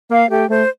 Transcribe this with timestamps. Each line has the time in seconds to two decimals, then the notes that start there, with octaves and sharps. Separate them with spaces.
0.11 A#3 F5
0.30 A3 G4
0.49 A3 C5